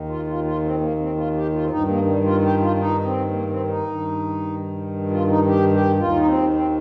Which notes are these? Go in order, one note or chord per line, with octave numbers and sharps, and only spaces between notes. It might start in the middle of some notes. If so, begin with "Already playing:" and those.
Already playing: D#2 D#3
F4
F4
F4
C4
A#3
C4
F4
G4
F4
C4
G2 D#3 D#4
A#3
G3
F4
G4
F4
D#4
C4
A#3
C4
D#4
G2 D#3
F4
D#4
G4
G4
D#2 D#3 F4
D#4
C4
C4